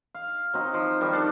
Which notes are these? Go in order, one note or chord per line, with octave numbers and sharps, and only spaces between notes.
F5
F#3 C4 D#4
F3
D#3 G3
D4 A4